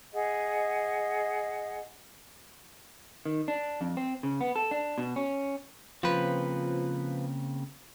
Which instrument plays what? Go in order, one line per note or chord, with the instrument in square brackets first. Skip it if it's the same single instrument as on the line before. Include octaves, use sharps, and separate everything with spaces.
[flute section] G#4 D#5 F#5
[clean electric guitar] D#3
D4
F2
C4
C#3
B3
A4
D4
B2
C#4
[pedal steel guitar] C#3 A#3 C4 [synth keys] F3 B4